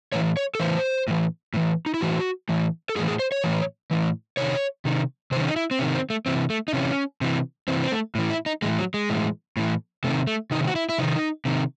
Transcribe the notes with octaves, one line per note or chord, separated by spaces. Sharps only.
A2 E3 C#5
C#5
A4
A2 E3 C5
A2 E3
A2 E3
D#4
E4
A2 E3 F#4
A2 E3
A4
A2 E3 G#4
G#4
C5
C#5
A2 E3
A2 E3
C3 D#3 C#5
C3 D#3
C3 D#3 C#4 C5
D#4
E4
C4
C3 D#3 C#4
C4
A3
C3 E3 C4
A3
D#4
C3 E3 C#4
C3 E3
C3 E3 C4
C4
A3
A2 E3
E4
D#4
A2 E3 G#3
F#3
G#3
A2 E3
A2 E3
C3 D#3 A3
A3
C3 D#3 D#4
F#4
E4
E4
C3 D#3 D#4
C3 D#3